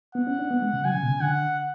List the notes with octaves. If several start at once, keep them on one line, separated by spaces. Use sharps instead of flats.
B3 F#5
C#4
D4
B3
G#3
C#3
F#3 G#5
C#3
B2
C#3
D3 F#5